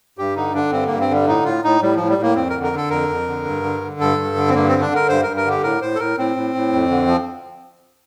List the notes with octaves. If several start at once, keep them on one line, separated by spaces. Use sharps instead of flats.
G2 G4
D3 D#4
D3 D4
G2 C4
G2 A#3
C4
D3 G3
A2 D#4
A2 F4
A2 D#4
A2 G3
A2 F3
G3
A2 A#3
F2 C4
A#4
D3
A#4
D3 A4
F2 A#4
F2
D3
G2
D3
D3
G2 A4
G2
D3
C4
G2 A#3
D3 C4
D4
D3 A#4
G2 C5
A#4
G2
A#4
D3 G4
A2 A#4
A2 C5
A4
A2 A#4
A2 C4
A2
A2
F2
D3
F3